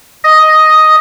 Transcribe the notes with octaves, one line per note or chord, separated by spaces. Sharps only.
D#5